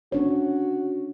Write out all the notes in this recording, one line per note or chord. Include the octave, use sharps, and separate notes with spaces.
C#4 D4 F#4 C#5